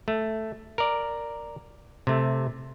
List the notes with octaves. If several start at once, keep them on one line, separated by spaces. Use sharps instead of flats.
A3
A#4 D5
C3 A3